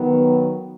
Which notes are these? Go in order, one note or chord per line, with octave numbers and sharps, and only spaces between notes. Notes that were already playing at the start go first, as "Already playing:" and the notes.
Already playing: D#3 F#3 B3